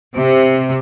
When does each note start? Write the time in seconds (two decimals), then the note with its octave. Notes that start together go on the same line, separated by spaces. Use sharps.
0.16 C3